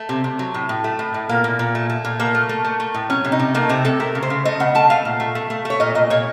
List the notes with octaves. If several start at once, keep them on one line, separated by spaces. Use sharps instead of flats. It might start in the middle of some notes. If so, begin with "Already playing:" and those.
Already playing: A3
C3
C3
F#3
A2
A2
A3
A2
A2
A#2 A#3
A#2
A#2
A3
A3
A#2
A3 A#3
A3
A3
A3
A3
A2
F#3 C#4
C3
D#4
C3
A3 A#3
C3 C4
C3 A4
A3 A#4
C#3
C5
C#3
A3 D#5
C#3 F#5
A3 A5
A3 F5
A#2
A3
A3
A3
A3 C#5
A#2 D#5
A#2 D#5
A#2 C#5